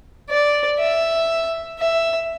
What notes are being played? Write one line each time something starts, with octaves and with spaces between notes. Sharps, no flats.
D5
E5
E5